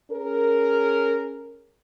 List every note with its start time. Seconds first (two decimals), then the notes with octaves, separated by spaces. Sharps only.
0.11 C#4 G#4 A#4